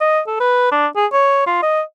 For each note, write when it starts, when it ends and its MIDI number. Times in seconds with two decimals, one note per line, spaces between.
0.01 0.20 75
0.27 0.40 69
0.40 0.70 71
0.72 0.87 62
0.96 1.06 68
1.12 1.42 73
1.46 1.61 65
1.62 1.81 75